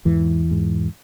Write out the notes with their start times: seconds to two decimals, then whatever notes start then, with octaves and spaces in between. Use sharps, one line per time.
0.05 E2 G#2 E3
0.51 G#2